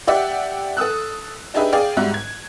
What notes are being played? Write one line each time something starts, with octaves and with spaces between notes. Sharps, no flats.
G4 D5 E5 F#5
A4 D#6 E6 F#6
D4 D#4 G4 G#4 B4 E5
G#4 D5 F5 G5
G#2 G3 F#4 E5 F#6
G#6